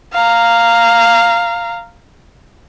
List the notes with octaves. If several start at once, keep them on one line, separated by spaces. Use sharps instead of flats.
F5 A#5